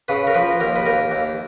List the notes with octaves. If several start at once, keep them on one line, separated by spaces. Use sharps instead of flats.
C#3 B4
A#4
F3 B4
D#2 A#4
B4
D#2 A#4
D#2